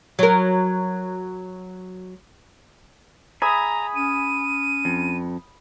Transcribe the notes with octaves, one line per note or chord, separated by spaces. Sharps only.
F#3 A#4
G#4 E5 A#5 B5 D#6
C#4 D#7
F2